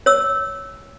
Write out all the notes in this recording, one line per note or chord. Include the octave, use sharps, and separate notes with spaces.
C#5 E6